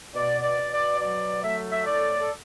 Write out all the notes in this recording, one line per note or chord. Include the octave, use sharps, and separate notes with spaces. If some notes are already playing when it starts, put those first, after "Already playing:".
B2 D5
D5
B2
D5
F#3 D5
A3 E5
E5
A2 D5
A4